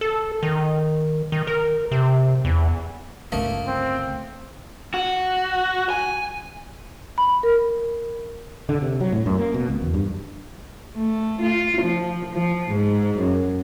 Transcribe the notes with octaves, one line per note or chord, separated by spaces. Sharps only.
A4
D#3
D#3
A#4
C3
E2
G1 C#2 A3 A#3 D#5
C4
F#4
G#5
B5
A#4
D3
C3
F#3
A2
F#2
A#3
B2
C#2
E2
G2
A3
F4
F3
F3
G#2
F#2